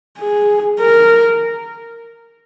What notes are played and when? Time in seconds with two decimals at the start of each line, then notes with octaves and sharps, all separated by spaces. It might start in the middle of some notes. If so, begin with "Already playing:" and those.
0.19 G#4
0.80 A#4